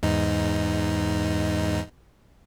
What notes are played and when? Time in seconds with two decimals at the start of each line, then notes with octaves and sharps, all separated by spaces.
0.03 E2 G#2 D#4